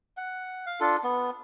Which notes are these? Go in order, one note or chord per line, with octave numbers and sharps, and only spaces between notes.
F#5
F5
D4 F4 A4
B3